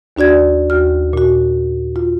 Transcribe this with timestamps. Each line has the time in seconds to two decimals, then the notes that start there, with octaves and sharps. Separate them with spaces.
0.17 D#2 D4 F#4 D5 G#6
0.70 D#2 F#4 F6
1.13 A#2 F#4
1.96 F4